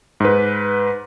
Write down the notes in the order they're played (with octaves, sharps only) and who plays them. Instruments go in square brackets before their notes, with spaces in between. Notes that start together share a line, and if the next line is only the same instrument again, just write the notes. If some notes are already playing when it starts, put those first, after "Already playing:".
[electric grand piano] G#2 B4